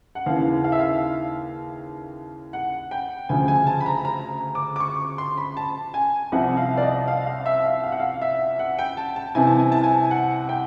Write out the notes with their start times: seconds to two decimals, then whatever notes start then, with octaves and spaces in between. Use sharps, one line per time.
0.15 F#5
0.26 D#2 C#3 E3 F5
0.64 F5
0.72 E5
0.79 F5
2.53 F#5
2.91 G5
3.29 D2 C#3 F3 G#5
3.48 G#5
3.67 A5
3.81 B5
3.86 A#5
4.05 A#5
4.55 D6
4.76 D6
4.80 C#6
5.18 C6
5.37 B5
5.57 A5
5.94 G#5
6.32 C2 C3 F3 F#5
6.57 F5
6.77 D5
6.83 D#5
7.08 F5
7.27 F5
7.46 E5
7.65 F5
7.84 F5
7.92 F#5
8.00 F5
8.22 E5
8.59 F#5
8.79 G5
8.97 A5
9.16 A5
9.35 C2 C3 E3 G#5
9.47 A5
9.59 G#5
9.72 A5
9.84 G#5
10.11 F#5
10.49 G5